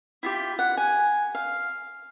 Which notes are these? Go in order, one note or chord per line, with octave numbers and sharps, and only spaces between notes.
E4 F4 G4
F#5
G#5
F5